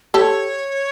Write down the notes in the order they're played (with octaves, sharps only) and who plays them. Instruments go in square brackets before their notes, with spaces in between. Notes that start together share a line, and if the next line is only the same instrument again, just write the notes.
[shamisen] G4 A4 [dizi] C#5